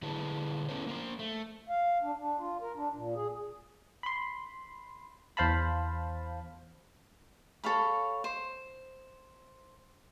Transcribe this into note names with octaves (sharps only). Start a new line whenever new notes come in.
D3 E4 G#4 B4 A5
B3 C#4 E4 A4 B4 C5
A#3 A#4 C5
A3
F5
D4
D4
F4
A#4
D4
A#2
G#4
B5 C6
E2 C5 F5 A5 B5
A4 C#5 F5 B5
C5